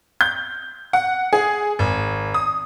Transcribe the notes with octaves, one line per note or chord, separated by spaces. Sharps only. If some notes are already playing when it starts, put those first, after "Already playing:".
G6
F#5
G#4
G#1
D#6